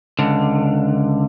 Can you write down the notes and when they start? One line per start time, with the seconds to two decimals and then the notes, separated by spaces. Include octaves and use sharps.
0.19 C#2 D3